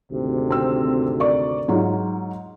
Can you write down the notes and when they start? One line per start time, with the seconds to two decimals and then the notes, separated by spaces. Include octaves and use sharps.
0.11 G#1 D2 C3
0.50 C4 E6
1.20 A#4 D5 C#6
1.68 G#2 F#3 F4